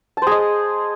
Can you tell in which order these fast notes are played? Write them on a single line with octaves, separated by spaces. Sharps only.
A5 C5 G#4 D#5